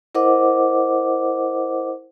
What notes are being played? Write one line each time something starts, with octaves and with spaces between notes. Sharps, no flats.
E4 A#4 C5 D#5 F#5 D6